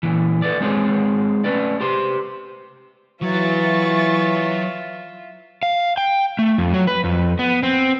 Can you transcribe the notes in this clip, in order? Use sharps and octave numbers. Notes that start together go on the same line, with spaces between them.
A#2 E3
A4 B4 D5
G#3 C4 D#4 G#4 C#5
A3 C#4 B4 D5
G4 C5 C6
E3 F#3 F4 E5 C#6 A6
F5
G5
A3
F2
F#3
B4
F2
B3
C4